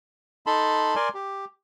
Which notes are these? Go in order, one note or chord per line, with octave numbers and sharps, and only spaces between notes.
D#4 A4 A5 B5 C6
A#4 D5 G#5 C6
G4